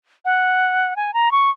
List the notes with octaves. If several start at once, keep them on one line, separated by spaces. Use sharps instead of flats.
F#5
G#5
A#5
C#6